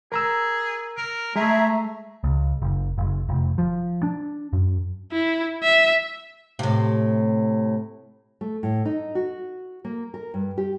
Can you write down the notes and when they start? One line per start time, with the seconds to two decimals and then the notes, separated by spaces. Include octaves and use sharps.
0.12 G#4 A#4 A#5 E6
0.97 A#4
1.36 G#3 A3 G#4 E5 A#5
2.24 C#2
2.62 F#1
2.98 F#1
3.29 F1
3.58 F3
4.03 D4
4.53 F#2
5.12 E4
5.63 E5
6.59 A2 C3
8.41 A3
8.63 A2
8.85 D#4
9.15 F#4
9.85 A#3
10.14 A#4
10.34 G2
10.58 G4